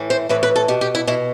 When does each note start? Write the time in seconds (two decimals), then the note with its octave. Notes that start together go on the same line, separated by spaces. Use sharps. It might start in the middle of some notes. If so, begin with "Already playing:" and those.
Already playing: A2 E3
0.10 C5
0.29 A2 E3 B4
0.43 B4
0.56 A4
0.68 B2 G4
0.81 G4
0.95 E4
1.07 B2 E4